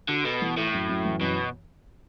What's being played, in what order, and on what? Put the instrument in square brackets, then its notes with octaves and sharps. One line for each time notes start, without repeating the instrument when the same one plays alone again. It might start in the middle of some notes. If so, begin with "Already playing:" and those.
[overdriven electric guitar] D3 [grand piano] F#4
[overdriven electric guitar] B2 [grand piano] A4
[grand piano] E3
[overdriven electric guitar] A2 [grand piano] A4
[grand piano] F#2
F#2
E3
[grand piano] F#2 [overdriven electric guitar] B2